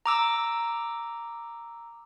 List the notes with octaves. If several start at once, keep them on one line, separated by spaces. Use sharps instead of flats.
A#5 D6 E6